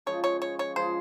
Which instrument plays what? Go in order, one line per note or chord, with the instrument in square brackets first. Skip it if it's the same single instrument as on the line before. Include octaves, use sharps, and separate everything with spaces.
[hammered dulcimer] C#3 F3 G#3 [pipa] C#5
[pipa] C#5
C#5
C#5
[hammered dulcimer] C#3 F3 G#3 [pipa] C5